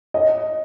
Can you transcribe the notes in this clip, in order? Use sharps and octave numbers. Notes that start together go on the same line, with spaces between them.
D#5